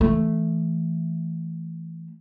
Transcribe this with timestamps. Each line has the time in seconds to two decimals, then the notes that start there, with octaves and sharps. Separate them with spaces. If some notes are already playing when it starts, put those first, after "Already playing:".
0.01 E3 A3